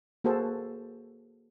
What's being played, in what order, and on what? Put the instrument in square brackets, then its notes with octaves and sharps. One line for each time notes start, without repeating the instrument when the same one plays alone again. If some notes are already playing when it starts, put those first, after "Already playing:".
[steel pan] A#3 F#4 G#4 A4 C5